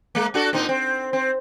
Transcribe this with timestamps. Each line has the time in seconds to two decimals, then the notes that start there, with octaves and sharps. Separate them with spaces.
0.15 G#3 A#3
0.34 D4 F#4 A4
0.53 A#2 C4 D#4
0.69 C4
1.13 C4